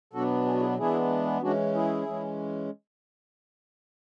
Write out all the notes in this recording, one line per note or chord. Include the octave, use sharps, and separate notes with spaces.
B2 F#3 B3 D4 F#4 A4
G#4
F#4
E4 G#4
E3 G#3 B3 D4 E4 G#4
E3 G#3 C#4 D4 F#4
E4 G#4
E3 G#3 C#4